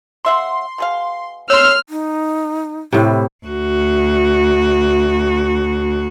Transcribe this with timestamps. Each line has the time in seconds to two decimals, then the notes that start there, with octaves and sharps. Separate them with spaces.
0.25 C#3 E5 F#5 C6
0.78 B2 G#4 F5
1.50 C#5 C6 E6 F6
1.89 D#4
2.93 A2 C3 E4
3.45 D2 F#4